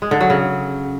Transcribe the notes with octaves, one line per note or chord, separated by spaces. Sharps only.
G#3
D3
F#3
C#3